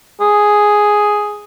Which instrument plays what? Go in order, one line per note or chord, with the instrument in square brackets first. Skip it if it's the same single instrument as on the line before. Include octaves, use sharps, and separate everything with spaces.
[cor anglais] G#4